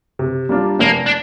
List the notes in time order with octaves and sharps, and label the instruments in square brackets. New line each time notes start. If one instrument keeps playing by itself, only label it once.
[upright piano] C3
G3 A#3 D4 F4
[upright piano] F1 [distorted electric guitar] A#3
[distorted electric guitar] D4